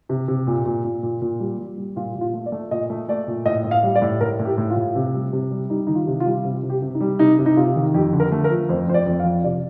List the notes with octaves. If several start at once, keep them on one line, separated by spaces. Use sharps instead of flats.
C3
C3
A#2
A#2
A#2
A#2
A#2
G3
G3
G3
A#2 F4
A#2
F4
A3
D5
A3
A#2 D#5
A3
A3 D5
A#2
A2 D#5
A2
F5
G3
D5
A2
A2 A#4
A2
G4
A2
F4
A2
C3
G3
C3
G3
G3 D#4
D#3 D#4
F4
C3
F4
G3
C3
C3
G4
C3
D#4
G3
C3 D#4
C3
D#4
C3 F4
D#3
F2 G4
D3
A#4
A3
A#4
F3
F2 C5
F2 C5
D5
F2
F5
F3
C3 D5